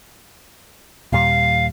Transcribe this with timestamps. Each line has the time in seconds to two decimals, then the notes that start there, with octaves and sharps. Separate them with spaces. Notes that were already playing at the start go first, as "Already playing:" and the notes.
1.12 D#2 A#2 G3 F5